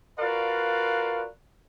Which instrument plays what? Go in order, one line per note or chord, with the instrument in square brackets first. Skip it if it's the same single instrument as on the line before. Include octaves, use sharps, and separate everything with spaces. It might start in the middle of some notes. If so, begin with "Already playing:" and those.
[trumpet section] F4 F#4 A#4 B4 D5 F5